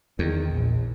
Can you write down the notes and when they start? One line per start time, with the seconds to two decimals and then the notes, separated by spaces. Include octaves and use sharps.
0.19 E2 D#3
0.49 A#1